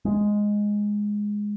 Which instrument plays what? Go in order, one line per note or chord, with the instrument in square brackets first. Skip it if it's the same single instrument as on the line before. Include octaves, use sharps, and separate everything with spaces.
[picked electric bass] G#3